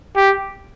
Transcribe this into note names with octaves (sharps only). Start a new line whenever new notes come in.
G4